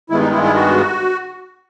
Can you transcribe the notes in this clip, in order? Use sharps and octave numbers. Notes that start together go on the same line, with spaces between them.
G2 D#3 G#3 B3 E4
D#4
E4
E4
F#4